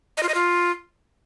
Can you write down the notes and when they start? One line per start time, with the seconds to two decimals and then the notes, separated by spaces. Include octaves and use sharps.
0.17 D#5
0.23 F4
0.29 D#5
0.34 F4